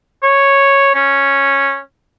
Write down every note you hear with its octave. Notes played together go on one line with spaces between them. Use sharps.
C#5
C#4